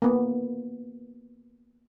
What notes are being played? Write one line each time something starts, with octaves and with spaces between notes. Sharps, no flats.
A#3 B3